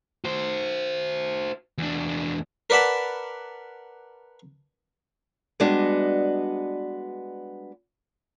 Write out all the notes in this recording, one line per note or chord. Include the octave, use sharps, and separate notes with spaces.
F#4 C5
E2 D4
A#4 B4 D5 F#5 A5 B5
G3 G#3 B3 D4 F#4 D#5